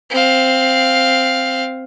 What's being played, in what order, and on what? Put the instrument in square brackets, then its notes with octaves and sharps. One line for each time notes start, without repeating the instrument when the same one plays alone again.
[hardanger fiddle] C4 F5